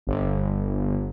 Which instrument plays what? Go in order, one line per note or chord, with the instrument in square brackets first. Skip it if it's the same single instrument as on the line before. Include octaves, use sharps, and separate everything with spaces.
[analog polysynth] G1